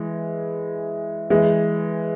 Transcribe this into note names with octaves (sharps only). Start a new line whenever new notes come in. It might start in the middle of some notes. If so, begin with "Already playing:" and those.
Already playing: E3 G#3
E3 G#3